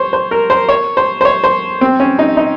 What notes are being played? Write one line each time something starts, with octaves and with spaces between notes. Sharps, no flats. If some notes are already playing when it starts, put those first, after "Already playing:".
Already playing: C5 C#5
C5
A#4
C5
C#5
C5
C5
C#5
C5
C4
C#4
D#4
D#4